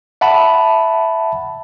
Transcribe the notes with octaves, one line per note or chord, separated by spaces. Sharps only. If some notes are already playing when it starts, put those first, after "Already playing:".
E5 F#5 A5 B5